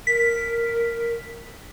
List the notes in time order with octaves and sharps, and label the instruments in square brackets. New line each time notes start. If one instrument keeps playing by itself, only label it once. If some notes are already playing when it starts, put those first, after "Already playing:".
[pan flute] A#4 [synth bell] B6